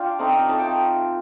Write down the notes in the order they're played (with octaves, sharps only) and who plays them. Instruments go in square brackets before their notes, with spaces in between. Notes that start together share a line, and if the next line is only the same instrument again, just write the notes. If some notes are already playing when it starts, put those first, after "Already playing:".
Already playing: [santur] D4 F4 F5 G5
A3 C4 D#4
A3 D#4 A5
G5